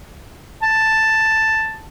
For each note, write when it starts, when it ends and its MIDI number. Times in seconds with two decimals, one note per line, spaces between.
0.63 1.80 81